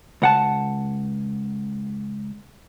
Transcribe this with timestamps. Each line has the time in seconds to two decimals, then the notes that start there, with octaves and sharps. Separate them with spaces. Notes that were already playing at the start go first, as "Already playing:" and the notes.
0.22 C#2 F#5 A5